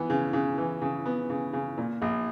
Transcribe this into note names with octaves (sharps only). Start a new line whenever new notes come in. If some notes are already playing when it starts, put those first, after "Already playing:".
Already playing: E3 B3
C#3
C#3
E3
C#3
B3
C#3
C#3
A#2
A#1